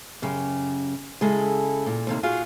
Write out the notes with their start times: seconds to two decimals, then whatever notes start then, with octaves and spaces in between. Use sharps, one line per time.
0.22 F#2 C#3 G4
1.21 C#3 G#3 E4 G#4 A4
1.86 A#2
2.07 D#2 C3 A#3
2.23 F4 F#4 G#4 F5